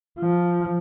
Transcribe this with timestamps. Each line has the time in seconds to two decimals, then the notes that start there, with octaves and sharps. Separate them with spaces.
0.18 F3